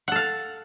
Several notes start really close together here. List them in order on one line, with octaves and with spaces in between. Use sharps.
F#5 A4 F5